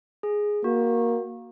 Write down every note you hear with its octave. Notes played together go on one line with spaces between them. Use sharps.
G#4
A#3 F#4